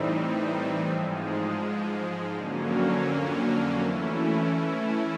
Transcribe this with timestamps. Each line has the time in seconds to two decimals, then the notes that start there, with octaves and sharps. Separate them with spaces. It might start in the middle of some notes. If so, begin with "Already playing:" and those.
Already playing: A2 E3 G3 C4 D#4
0.87 G#2 F3 G#3
2.33 F2 D3 F#3 A#3 C#4
3.80 E3 A3 C#4 E4